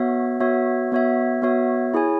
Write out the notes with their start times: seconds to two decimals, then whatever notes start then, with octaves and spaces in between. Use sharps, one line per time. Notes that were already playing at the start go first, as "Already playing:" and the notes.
Already playing: B3 F#4 C#5 E5
0.40 B3 F#4 C#5 E5
0.92 B3 F#4 C#5 E5
1.42 B3 F#4 C#5 E5
1.94 E4 G#4 C#5 G#5